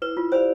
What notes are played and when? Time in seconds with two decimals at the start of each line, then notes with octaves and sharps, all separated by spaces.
0.02 E4 B4
0.17 F4
0.32 G4 C5 D5 F5